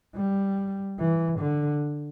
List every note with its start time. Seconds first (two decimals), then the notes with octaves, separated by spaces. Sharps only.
0.15 G3
0.99 E3
1.40 D3